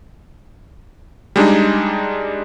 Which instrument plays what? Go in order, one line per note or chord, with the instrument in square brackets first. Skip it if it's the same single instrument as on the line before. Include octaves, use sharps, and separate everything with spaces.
[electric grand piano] G3 G#3 D4 D#4